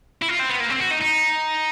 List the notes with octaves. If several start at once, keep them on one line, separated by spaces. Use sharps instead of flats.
E4
F4
C4
B3
A#3
C4
F#4
D#4
D#4